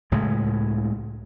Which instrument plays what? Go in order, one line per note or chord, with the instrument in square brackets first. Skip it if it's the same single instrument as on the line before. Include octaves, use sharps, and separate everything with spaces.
[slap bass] C#2 A2 C#3 G#3